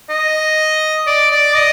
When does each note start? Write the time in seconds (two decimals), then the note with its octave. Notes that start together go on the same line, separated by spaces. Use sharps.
0.10 D#5
1.07 D5
1.32 D5
1.56 D#5